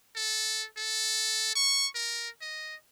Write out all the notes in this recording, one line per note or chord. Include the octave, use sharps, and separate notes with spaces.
A4
A4
C#6
A#4
D#5